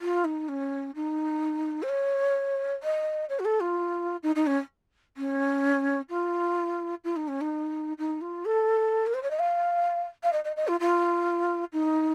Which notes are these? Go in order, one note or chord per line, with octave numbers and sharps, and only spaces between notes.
F4
D#4
C#4
D#4
C5
C#5
D#5
C#5
F#4
A4
F4
D#4
D#4
C#4
C#4
F4
F4
D#4
C#4
D#4
D#4
F4
A4
A#4
C5
C#5
D#5
F5
F5
D#5
D#5
D#5
F4
F4
D#4